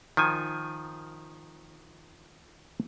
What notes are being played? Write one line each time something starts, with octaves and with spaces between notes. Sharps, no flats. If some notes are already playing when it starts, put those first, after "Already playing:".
D#3 F3 G#5